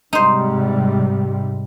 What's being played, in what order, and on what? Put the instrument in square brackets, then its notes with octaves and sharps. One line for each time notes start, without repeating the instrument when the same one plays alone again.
[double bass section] G#2 C3 G3 [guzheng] D#4 C5